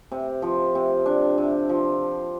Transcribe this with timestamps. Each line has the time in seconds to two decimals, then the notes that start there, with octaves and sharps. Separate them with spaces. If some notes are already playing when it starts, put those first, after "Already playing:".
0.12 C3
0.42 F3
0.75 C3
1.06 D4
1.38 C3
1.69 F3